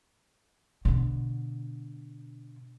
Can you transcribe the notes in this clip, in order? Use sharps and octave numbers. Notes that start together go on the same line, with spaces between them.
B2 D3